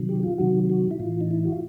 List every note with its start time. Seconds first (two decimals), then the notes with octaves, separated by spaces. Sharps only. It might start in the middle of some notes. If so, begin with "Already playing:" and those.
Already playing: C3 D#3 F#3
0.09 G4
0.23 F4
0.38 C3 D#3 F#3 F#4
0.70 F#4
0.91 E4
1.00 A2 E3 F4
1.21 D#4
1.31 E4
1.45 F#4
1.52 F4